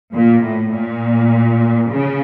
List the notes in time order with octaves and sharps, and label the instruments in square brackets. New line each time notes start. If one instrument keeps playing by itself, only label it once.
[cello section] A#2
A2
A#2
C#3